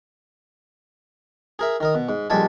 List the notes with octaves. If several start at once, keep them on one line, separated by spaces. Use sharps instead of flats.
G#4 A#4 E5
D#3 A#4 D#5
B2
G#2
A#1 G3 G#3 A4 G#5 A5